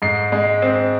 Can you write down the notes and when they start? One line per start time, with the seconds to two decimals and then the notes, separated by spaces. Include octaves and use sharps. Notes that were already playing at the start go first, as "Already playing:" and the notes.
0.02 G#2 C7
0.32 G#3
0.62 C4